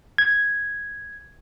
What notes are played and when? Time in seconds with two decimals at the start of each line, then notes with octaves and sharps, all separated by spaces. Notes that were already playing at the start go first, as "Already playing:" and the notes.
0.18 G#6